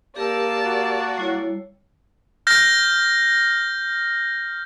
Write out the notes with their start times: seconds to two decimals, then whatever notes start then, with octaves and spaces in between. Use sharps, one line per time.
0.16 A#3 G4 A#4 D5 A5 E6
0.65 F#4
1.18 G3 E4 C#5
2.47 F6 G6 A#6